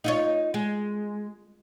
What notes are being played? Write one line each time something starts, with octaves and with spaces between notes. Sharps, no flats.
D#4 F4 C#5
G#3